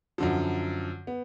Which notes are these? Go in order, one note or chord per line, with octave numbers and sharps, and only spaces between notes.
F#2 D3 F3
B3